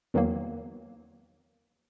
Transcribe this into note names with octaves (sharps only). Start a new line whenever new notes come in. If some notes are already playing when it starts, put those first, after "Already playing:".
E2 D#3 E3 F#3 A#3